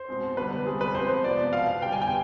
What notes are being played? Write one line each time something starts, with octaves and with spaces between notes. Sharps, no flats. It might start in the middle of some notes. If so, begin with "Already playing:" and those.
Already playing: C5
B2 G#3 C4
D3 G3 B3 B4
C3 G3 C4 G#4
B4
C3 F3 G#3 B3 C5
C3 F3 B3 D5
B2 B3 F5
D3 G3 B3 G5
G#5
G5